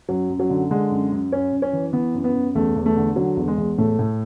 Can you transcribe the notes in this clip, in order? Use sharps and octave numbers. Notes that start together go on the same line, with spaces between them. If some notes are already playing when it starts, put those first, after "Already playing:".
F#2 F#3
F#2
F#3
D3
D3 G#3
F#2
F#2
F#2 C#4
F#2
C#4
E3
E3 B3
F#2
B3
F#2
E2 A3
E2
A3
D3
D3 F#3
E2
G#3
E2
A2 A3
A2